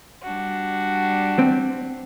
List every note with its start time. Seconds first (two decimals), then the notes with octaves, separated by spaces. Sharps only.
0.21 G3 D4 F#4
1.39 C4